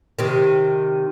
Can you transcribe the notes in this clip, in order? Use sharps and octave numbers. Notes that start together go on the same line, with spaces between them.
C3 D#3